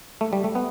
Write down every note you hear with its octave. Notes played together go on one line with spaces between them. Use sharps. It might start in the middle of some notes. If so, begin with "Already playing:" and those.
A3
G3
A3
B3